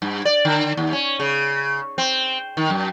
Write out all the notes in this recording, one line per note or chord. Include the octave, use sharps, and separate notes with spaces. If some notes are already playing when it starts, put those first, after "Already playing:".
G2
D5
D3
D#2
C#4
C#3
C4
D#3
F#2